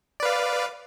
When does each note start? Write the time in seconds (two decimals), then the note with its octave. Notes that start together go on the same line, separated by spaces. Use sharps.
0.20 D5
0.23 B4
0.25 F5